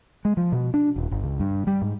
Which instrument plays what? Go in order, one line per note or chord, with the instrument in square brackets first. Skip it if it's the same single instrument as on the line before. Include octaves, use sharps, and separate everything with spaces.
[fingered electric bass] G#3
F3
B2
D4
D#1
G1
C#2
G2
G3
G#2